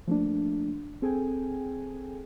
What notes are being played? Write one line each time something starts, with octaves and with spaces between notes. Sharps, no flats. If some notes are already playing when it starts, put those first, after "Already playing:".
F3 A3 A#3 D4
C4 G#4 A4 G5 G#5